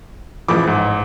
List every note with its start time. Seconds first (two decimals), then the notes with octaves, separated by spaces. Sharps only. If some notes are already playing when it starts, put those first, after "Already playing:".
0.48 A1 E3 F3 G#4 D6
0.67 G#2